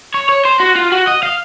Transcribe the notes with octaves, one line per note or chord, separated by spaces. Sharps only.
C#5
C#5
C5
F#4
F4
F#4
D#5
F5